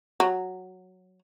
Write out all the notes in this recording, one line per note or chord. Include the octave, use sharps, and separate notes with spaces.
F#3